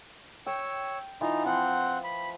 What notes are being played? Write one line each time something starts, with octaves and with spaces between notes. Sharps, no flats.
C#5 G5 E6
E3 D#4 F4
F3 C4 F#5
B5